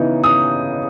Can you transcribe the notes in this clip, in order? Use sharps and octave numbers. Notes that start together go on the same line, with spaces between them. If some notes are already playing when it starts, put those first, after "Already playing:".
Already playing: C#3 E3 B3 D#4
D#6